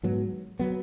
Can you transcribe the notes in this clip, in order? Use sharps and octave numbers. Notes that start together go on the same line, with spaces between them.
G#2 F#3 B3
F#3 B3